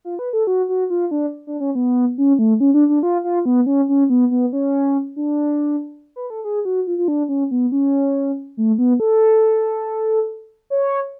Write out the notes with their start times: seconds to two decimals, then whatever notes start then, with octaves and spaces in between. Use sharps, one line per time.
0.05 F4
0.19 B4
0.33 A4
0.47 F#4
0.69 F#4
0.90 F4
1.11 D4
1.47 D4
1.60 C#4
1.75 B3
2.18 C#4
2.39 A3
2.60 C#4
2.74 D4
2.89 D4
3.03 F4
3.24 F4
3.45 B3
3.66 C#4
3.89 C#4
4.10 B3
4.31 B3
4.53 C#4
5.16 D4
6.16 B4
6.30 A4
6.44 G#4
6.65 F#4
6.87 F4
6.98 F4
7.08 D4
7.29 C#4
7.51 B3
7.72 C#4
8.57 A3
8.78 B3
9.00 A4
10.70 C#5